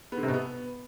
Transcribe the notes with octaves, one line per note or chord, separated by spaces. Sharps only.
B3
D3
C3
B2
B3